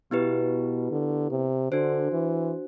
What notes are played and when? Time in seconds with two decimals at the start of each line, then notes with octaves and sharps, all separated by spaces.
0.11 B2 B3 E4 G4 B4
0.91 D3
1.31 C3
1.71 D3 D4 F#4 C5
2.12 E3